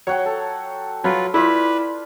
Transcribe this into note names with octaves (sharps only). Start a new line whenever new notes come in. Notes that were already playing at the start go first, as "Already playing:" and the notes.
F#3 C#5 F#5 G5
A4
F#3 F4 B4
E4 F4 B4 D5